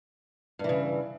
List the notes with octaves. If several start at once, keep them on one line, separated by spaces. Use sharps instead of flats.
G2 C#3 E3